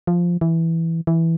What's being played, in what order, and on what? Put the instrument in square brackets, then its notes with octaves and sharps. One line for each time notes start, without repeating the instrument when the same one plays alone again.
[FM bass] F3
E3
E3